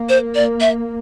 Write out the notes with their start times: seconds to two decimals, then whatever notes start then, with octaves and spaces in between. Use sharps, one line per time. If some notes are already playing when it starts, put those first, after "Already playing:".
Already playing: A#3
0.09 C5
0.35 D5
0.61 E5